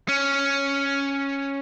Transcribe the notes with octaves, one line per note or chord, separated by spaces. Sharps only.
C#4